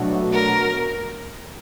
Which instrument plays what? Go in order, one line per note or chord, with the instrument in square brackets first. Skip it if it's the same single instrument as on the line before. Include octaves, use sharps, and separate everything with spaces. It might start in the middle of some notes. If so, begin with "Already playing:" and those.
Already playing: [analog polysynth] B2 F#3 A3 D4 F#4
[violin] A#4